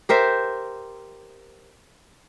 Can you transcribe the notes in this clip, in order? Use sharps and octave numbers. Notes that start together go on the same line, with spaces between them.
G4 A#4 C5 E5